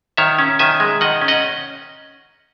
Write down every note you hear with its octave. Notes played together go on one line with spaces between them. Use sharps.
D#3 C#5 E5
C#4
D#3 E5 G#5
G#3
D#3 D#5 F#5
C#4
D#5 F#5